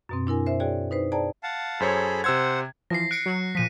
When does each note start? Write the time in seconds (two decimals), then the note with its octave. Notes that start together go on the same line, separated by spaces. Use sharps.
0.09 F#2 B2 C4
0.27 D4 E4 A#4 G#5
0.46 C5 E5
0.60 F#4 G#4 C#5 D5 G5
0.91 D#4 B4 C5
1.12 G#4 C5 D5 G5 A5 A#5
1.43 F5 F#5 A5
1.80 F#2 G#4 A4 C5 C#5 B5
2.24 C3 C5 F#5 E6 G#6
2.90 E3 F3 A#6 C7
3.11 F#6 C#7 D7
3.26 F#3
3.55 A#2 F3 B6 D#7